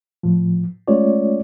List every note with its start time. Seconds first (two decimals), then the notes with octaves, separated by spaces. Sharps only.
0.23 A2 F3
0.88 G#3 A3 C#4 F4 C#5 D5